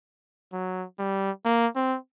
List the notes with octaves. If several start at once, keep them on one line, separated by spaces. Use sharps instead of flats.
F#3
G3
A#3
C4